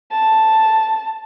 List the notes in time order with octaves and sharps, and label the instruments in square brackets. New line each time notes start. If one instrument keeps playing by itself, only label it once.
[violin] A5